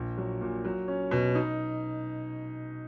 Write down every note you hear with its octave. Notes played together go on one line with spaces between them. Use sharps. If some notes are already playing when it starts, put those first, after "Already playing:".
Already playing: A#1
F#3
A#2
F#3
C#4
B2
D#4